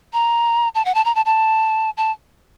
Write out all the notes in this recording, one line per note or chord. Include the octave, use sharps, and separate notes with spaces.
A#5
A5
F#5
A5
A#5
A5
A5
A5